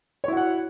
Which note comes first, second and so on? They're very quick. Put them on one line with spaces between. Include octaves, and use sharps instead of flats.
C#5 E4 F#4 F#5